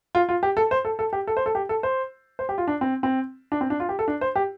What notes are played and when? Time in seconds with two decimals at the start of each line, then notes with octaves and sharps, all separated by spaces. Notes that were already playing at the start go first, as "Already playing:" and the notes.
0.15 F4
0.29 F4
0.43 G4
0.57 A4
0.71 C5
0.85 A4
0.99 A4
1.13 G4
1.27 A4
1.37 C5
1.46 A4
1.55 G4
1.69 A4
1.83 C5
2.39 C5
2.49 G4
2.58 F4
2.68 D4
2.81 C4
3.03 C4
3.52 D4
3.61 C4
3.70 D4
3.80 F4
3.89 G4
3.99 A4
4.08 D4
4.21 C5
4.36 G4